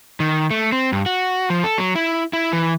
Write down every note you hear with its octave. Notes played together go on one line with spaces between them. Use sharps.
D#3
A3
C4
G2
F#4
F3
A4
F#3
E4
E4
E3